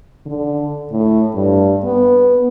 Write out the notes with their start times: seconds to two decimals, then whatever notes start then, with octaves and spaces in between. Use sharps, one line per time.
0.26 D3
0.92 A2
1.35 G2
1.84 B3